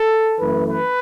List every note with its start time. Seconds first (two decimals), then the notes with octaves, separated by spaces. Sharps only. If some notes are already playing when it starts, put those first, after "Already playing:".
Already playing: A4
0.40 F#2 E3 A3 B4
0.69 B4